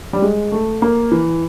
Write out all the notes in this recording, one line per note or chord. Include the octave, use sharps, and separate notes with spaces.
G3
G#3
A3
A#3
E3